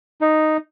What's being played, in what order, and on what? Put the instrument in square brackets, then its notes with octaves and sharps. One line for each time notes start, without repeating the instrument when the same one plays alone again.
[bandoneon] D#4